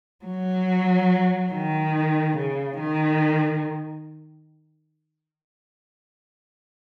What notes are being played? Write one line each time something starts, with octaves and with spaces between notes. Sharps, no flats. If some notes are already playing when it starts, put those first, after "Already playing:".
F#3
D#3
C#3
D#3